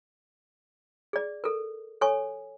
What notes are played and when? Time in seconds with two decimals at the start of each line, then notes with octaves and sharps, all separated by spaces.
1.13 G#4 D5
1.44 A4 A#4
2.01 A4 C#5 G#5 C#6